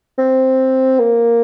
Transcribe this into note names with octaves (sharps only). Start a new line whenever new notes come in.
C4
A#3